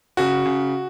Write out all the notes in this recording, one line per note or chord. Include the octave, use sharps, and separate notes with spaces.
C#3 F#4
C#3